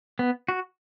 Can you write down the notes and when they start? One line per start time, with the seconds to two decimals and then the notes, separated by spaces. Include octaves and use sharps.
0.19 B3
0.48 F#4